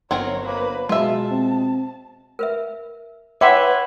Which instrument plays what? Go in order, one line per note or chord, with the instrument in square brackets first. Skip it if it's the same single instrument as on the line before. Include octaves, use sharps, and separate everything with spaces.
[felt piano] G1 [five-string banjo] F#3 C4 A#4 [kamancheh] C#5
[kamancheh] A#3 B4
[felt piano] B2 G#3 [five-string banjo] F4 E5 [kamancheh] A5
[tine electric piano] C4
[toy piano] A#4 B4 E5
[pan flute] B4 [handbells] C#5 B5 C6 [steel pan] E5 [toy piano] F#5 G5 D6